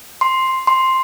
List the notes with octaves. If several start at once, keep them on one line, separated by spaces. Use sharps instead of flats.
C6
C6